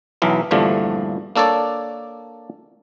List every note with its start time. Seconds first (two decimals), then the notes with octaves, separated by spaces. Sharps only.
0.22 B1 E3 F#3
0.51 A#1 E2 G2 D3 F3 A3
1.36 A#3 D4 A4 C#5 D5